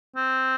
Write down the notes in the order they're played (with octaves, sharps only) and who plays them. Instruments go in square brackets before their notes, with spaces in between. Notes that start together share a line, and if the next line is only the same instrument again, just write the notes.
[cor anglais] C4